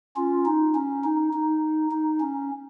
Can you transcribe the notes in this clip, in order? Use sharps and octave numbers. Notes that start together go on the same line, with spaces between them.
C#4 F4
D#4
C#4
D#4
D#4
D#4
C#4